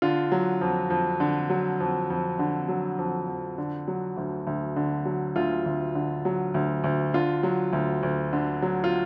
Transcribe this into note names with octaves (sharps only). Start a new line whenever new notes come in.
D3 F4
F#3
F2
F2
D3
F#3
F2
F2
D3
F#3
F2
F2
D3
F#3
D2
D2
D3
F#3
D2 F4
D2
D3
F#3
D2
D2
D3 F4
F#3
D2
D2
D3
F#3
F4